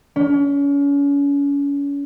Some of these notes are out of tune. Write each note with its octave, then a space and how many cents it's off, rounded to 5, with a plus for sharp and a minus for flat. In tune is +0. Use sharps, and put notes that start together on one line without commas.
C#4 +35